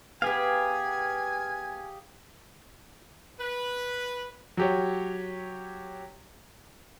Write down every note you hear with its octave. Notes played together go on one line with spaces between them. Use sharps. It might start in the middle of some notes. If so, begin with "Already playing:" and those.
B3 G4 G#4 B4 F5 G#5
B4
F#3 G4 C#5